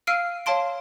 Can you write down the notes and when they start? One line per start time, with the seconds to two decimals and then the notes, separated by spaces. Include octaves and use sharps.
0.07 F5 E6 F6 C7 D7 D#7
0.46 C#5 F5 A5 C6 D7